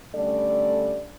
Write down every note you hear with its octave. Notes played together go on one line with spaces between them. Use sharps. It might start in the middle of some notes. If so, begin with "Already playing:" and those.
D3 G3 A3 C#4 A4 D5